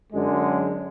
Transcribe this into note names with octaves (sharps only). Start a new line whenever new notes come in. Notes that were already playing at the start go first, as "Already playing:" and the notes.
F#2 D3 G#3